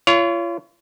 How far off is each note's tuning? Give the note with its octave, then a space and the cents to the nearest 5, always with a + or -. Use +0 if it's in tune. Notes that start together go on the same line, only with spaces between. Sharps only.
F4 -35 C#5 +25